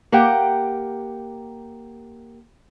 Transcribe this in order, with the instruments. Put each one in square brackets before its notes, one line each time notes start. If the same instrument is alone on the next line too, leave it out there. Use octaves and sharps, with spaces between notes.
[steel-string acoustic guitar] A#3 G4 F#5 G5